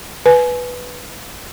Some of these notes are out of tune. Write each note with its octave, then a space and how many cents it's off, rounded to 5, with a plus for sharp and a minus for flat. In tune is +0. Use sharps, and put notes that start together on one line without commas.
B4 +0 G#5 +25